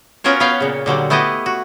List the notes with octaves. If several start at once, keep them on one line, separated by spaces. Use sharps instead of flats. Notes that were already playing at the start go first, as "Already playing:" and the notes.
B3 C#4 F4 F#4 A#4 C#5
B3 B4 C#5 F5 G5
A#2 C#3
A#2 D3 F#3 G3
A3 B3 E4 G4 D#5
F#4